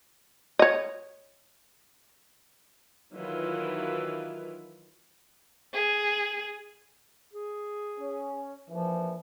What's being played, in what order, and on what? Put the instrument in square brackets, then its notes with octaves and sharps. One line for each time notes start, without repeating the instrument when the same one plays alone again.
[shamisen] C#5 D#5
[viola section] D#3 E3 F#3 E4 F4 B4
[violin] G#4
[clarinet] G#4
[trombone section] C#4
[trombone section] A#1 E3 [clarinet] F3